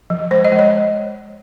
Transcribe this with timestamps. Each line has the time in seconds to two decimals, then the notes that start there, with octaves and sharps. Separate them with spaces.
0.10 F3
0.31 G#3 C5
0.45 D#5
0.52 G#3
0.59 C#5